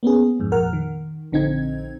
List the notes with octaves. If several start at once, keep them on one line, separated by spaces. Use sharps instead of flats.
A#3 B3 C#4 G#4
F2 G#2
G#1 F2 A#2 A#4 F#5 F6
D#3
A#1 D3 C4 D#4 G#6